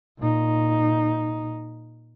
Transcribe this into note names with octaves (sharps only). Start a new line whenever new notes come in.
A#2 D#4